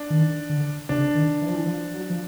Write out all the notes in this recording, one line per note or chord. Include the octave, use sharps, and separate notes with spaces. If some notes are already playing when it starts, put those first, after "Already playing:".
Already playing: D4
D#3
D3
C#3 D4
D#3
E3
F3
E3
F3
F#3
F3